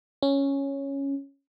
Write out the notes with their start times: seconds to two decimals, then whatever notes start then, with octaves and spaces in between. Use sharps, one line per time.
0.22 C#4